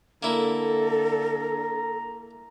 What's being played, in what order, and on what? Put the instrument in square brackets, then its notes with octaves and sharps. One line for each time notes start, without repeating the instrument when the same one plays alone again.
[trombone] D3 [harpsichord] A#3 E4 [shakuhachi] A4 [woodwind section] A#5